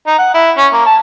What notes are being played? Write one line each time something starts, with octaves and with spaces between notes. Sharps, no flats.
D#4
F#5
E4
C#4
A#3
A5